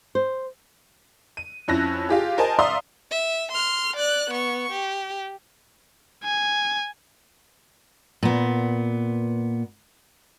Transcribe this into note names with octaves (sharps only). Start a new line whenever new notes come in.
C5
D#7
F2 C#4 E4 F#6 A#6
F4 G4 G#4
A#4 C5 D#5 G#5 A5
D5 E5 F5 A#5 C6 D#6
E5
C6 F6
D5 F#6
B3 C#6
G4
G#5
A#2 B3